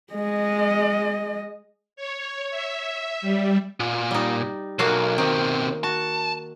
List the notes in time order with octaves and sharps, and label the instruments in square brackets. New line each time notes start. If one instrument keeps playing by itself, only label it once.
[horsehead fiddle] G#3 D#5
[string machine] C#5
E5
G3
[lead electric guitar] A#2
[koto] G3 D#4
[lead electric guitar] B1 [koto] A#3 F#4 F5
[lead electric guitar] B2 C4 [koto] D#3 A#3
[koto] F#4 [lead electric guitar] A5